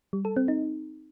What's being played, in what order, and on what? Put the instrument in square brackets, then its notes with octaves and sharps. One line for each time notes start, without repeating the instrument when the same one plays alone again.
[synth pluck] G3
A4
C4
D#4